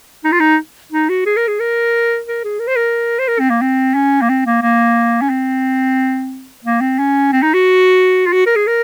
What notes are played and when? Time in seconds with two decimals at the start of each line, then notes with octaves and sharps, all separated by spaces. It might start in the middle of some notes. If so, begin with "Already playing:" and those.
0.24 D#4
0.32 F4
0.40 D#4
0.92 D#4
1.09 F#4
1.26 G#4
1.37 A#4
1.48 G#4
1.60 A#4
2.27 A#4
2.44 G#4
2.60 A#4
2.67 C5
2.76 A#4
3.19 C5
3.28 A#4
3.39 C4
3.50 A#3
3.62 C4
3.95 C#4
4.22 A#3
4.29 C4
4.46 A#3
4.62 A#3
5.22 C#4
5.30 C4
6.64 A#3
6.81 C4
6.99 C#4
7.32 C4
7.43 D#4
7.54 F#4
8.26 F4
8.33 F#4
8.46 A#4
8.56 G#4
8.67 A#4